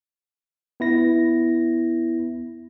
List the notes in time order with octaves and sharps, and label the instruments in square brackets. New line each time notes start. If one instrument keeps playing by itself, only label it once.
[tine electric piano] B3 E4 A#6